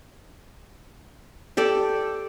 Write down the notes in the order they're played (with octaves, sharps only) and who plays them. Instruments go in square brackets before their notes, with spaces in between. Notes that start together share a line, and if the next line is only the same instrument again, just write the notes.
[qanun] G4 A4 D5